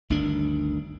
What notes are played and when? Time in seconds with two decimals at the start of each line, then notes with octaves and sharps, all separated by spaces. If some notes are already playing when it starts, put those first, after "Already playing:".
0.10 G1 D2 D#3 D4